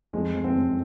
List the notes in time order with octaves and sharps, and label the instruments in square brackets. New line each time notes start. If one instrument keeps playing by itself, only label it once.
[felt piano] F2 [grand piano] G#3
[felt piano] F2
[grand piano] C4
[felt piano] F#2